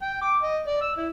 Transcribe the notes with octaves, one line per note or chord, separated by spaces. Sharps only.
G5
D6
D#5
D5
E6
E4